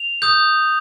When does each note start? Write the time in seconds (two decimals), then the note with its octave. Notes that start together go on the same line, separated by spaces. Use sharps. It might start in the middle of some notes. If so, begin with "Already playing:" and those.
Already playing: F7
0.22 D#6 G6